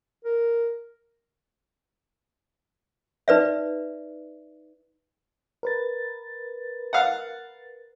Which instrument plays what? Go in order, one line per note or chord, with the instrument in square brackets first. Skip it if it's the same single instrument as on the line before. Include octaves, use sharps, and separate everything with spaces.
[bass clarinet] A#4
[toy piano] D#4 B4 D5 E5
[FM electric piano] A#4 B4 A6
[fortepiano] F5 F#5